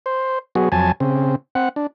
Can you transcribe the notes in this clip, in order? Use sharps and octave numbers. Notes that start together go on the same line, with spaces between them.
C5
F#3 B3 F#4 G#4
F2 F#3 G#5 A5
C#3 C4
C4 F#5
D4